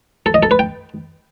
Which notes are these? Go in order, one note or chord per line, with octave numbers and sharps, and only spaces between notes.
A4
D#5
A4
B4
G5